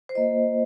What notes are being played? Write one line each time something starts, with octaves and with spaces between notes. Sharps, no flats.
C5
A#3 F4 D#5